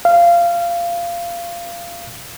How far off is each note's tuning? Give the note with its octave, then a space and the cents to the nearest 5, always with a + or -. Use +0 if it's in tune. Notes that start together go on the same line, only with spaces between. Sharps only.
F5 -20